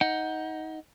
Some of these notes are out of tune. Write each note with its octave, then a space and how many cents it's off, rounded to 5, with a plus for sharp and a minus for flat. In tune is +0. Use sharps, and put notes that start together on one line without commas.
D#4 +15 F#5 +0